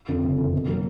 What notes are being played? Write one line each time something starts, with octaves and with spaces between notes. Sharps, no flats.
F2 D3
F#1
F2 D3
B2
F#3 A#3